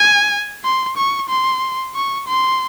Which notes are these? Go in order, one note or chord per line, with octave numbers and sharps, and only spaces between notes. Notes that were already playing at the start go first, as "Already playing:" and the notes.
Already playing: G#5
C6
C#6
C6
C#6
C6